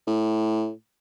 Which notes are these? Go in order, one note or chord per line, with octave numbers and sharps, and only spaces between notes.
A2